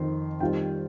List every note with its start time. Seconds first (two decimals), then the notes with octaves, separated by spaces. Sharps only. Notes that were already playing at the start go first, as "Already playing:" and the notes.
Already playing: F2 D#3 C6
0.40 D#3 G3 C4 F4 G5